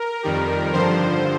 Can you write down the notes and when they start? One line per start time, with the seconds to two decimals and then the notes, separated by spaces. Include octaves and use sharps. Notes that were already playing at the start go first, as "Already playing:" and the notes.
Already playing: A#4
0.23 F2 D#3 G3
0.72 G2 D3 F3 C5